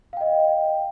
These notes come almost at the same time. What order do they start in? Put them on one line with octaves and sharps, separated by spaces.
F5 G5 D#5